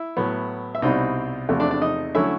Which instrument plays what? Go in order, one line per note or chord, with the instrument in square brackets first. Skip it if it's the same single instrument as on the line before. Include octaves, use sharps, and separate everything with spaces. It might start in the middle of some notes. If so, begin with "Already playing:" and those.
Already playing: [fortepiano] E4 E5
A2 F#3 B3
E5
C2 B2 G3 C4 D#4 E4 D#5
E2 C3 F3 A3
D4 D5
D4 D5
D#4 D#5
D3 F#3 A3 C#4 E4 E5